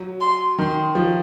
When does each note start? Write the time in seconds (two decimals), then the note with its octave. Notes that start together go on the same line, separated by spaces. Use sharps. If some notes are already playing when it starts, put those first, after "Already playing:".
Already playing: F#3
0.21 C6
0.58 D#3 C6
0.95 F3